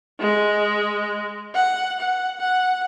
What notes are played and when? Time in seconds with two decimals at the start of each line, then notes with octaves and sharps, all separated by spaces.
0.20 G#3
1.55 F#5
2.00 F#5
2.40 F#5